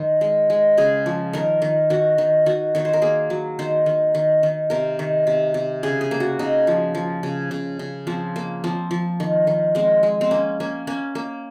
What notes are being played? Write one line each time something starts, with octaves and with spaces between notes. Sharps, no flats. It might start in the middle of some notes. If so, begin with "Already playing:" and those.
Already playing: D#3 C5
G#3
G#3
C#3 G#4
F3
D#3 A#4
D#3
D#3 F#4
D#3
D#3 F#4
D#3 C#5
C5
A#4
A#3 G#4
F#3
D#3 C5
D#3
D#3
D#3
C3 A#4
D#3
C3
C3
C#3 G#4
G#4
A#3
F#4
C#3 D#4
F3
F3
C#3
C#3
C#3
F3 C4
A#3
F3 C4
F3
D#3
D#3
G#3 C4
G#3
C4
A#3 C#4
A#3 C#4
A#3 C#4
A#3